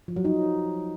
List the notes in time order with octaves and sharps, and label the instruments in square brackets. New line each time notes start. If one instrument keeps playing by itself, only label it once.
[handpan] F3
F#3
D#4